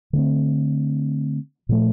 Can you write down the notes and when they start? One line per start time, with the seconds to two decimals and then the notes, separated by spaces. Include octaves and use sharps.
0.13 D3 A3 C4
1.69 A#2 F3 A3